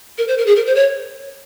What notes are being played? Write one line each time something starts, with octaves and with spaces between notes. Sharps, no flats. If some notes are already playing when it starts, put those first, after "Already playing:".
A#4
C5
A#4
G#4
A#4
C5
C#5